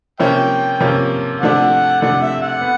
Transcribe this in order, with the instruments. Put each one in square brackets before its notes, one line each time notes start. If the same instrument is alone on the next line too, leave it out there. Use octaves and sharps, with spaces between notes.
[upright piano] C3 F3 A#3 C#4 [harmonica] E5 G5
[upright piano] C3 F3 A#3 C#4
[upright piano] C3 F3 A3 D4 [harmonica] F#5
[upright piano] C3 F3 A3 D4 [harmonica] F#5
[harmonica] E5
F#5
[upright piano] B3